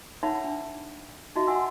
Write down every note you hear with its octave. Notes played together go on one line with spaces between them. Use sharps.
D#4 A#4 C#5 E5 F#5 B5
D4
D#4 F#4 D#5 E5
F#4 F#5 G#5 C6 E6